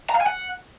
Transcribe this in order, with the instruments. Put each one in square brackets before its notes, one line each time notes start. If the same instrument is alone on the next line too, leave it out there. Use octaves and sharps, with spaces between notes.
[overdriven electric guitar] A#5
F5
G#5
F#5